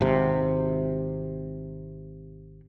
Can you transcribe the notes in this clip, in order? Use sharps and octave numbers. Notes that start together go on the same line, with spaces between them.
G#1 C3